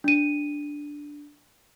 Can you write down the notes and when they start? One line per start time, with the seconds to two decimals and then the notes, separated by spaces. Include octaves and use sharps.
0.04 D4 D#7